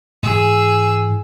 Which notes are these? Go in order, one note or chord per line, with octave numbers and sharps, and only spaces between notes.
G#2 E3 G#4 E6